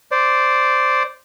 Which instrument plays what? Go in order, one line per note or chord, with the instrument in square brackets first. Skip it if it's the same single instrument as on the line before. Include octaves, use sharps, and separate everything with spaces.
[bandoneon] C5 D5